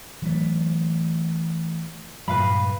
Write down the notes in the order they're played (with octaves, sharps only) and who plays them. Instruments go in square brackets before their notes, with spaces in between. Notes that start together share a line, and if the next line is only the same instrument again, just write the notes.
[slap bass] E3 F#3 A3
[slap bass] G2 A#2 F#3 [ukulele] B4 F5 B5